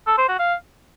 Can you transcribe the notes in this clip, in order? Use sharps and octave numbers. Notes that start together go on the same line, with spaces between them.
A4
C5
F#4
F5